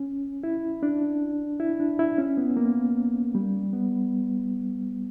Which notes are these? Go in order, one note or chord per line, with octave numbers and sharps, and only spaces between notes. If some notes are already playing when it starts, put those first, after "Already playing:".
Already playing: C#4
E4
D4
E4
D4
E4
C#4
B3
A#3
G3
B3